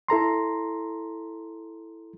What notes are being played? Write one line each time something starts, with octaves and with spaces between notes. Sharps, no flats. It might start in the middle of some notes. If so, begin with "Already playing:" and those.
E4 A4 A#5 C6